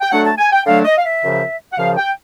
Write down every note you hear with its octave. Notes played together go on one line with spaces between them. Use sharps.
G5
D3 F#3 A3 D4 F#5
A5
G#5
G5
D3 F#3 A3 D4 F5
D#5
F5
E5
F#2 C#3 F3
F#5
F#2 C#3 F3 F5
G5